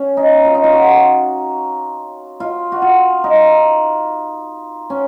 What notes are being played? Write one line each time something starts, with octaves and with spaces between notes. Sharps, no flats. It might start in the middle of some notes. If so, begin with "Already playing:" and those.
Already playing: C#4
D#4
F4
D#4
F4
F#4
F4
F#4
F4
D#4
C#4